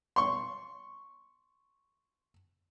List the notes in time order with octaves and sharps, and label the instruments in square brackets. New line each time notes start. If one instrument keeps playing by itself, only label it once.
[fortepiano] C6 C#6